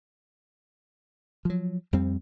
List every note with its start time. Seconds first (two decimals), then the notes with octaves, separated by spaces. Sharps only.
1.45 F3 F#3
1.93 F2 G3 C4